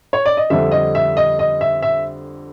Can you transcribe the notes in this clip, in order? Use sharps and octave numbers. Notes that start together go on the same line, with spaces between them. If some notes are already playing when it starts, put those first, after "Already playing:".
C#5
D5
D#5
F2 D3 G3 E5
D#5
E5
D#5
D#5
E5
E5